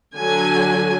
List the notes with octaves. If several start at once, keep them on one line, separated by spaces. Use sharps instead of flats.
D3 F#3 G#5